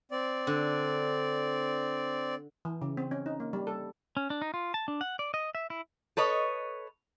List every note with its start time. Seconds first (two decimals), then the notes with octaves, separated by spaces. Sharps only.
0.11 C4 D5
0.47 D3
2.65 E3
2.82 C#3
2.97 C4
3.11 C#4
3.26 D#4
3.40 A#3
3.53 G3
3.67 A4
4.17 C#4
4.30 D4
4.42 D#4
4.54 F4
4.74 A5
4.88 D4
5.01 F#5
5.19 D5
5.34 D#5
5.55 E5
5.70 E4
6.17 A4 B4 C#5 D#5